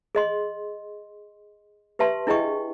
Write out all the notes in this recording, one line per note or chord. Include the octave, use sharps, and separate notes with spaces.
G#4 D#5 C6
G4 B4 E5 A5 C6
D4 E4 G#4 D#5 G5 C#6